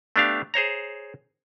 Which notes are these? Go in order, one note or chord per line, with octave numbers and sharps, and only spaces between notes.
A3 B3 D4 G4 F5
G#4 C5 C#5 A#5